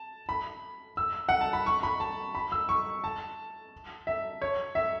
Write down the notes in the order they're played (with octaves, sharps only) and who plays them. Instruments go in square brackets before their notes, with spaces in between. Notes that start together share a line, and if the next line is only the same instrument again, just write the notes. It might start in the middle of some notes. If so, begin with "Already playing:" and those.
Already playing: [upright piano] A5
B5
E6
F#5
A5
B5
C#6
B5
A5
B5
E6
C#6
A5
E5
C#5
E5